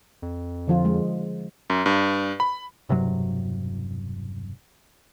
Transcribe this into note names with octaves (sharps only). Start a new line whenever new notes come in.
F2
D3 F3 F4
F3 G#3
F#2
G2
B5
E1 G2 C3 F#3